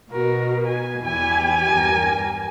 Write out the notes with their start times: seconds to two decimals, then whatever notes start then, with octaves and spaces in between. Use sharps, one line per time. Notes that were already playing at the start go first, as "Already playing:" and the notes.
0.11 B2 F#4 A#4
0.66 G#5
1.02 E2 E4 G4 G#5
1.70 E2 G2 A#4